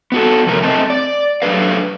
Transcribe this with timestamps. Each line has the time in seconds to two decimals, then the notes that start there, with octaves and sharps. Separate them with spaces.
0.12 B3 F#4 A4
0.47 F2 C3 A3 A#4
0.63 A3 C4 D#5 G#5 A5
0.90 D5
1.42 F#3 A3 D4 G4 B4 F5